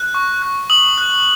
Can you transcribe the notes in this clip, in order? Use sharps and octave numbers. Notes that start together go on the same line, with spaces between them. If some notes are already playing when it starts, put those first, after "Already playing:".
Already playing: F#6
C#6
F#6
D#6 F#7
F#6